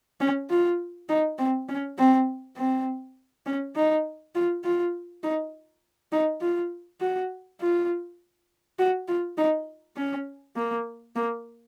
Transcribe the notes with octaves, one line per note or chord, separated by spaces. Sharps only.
C#4
F4
D#4
C4
C#4
C4
C4
C#4
D#4
F4
F4
D#4
D#4
F4
F#4
F4
F#4
F4
D#4
C#4
A#3
A#3